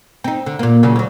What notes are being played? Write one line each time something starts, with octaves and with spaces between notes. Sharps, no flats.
C4 D#4
D3
A#2 A#3
A#2 C#3 F#3
D2 F#3